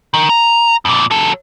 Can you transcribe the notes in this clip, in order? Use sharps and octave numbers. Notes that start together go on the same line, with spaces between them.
D#3
A#5
F2 A#2
F#3 A4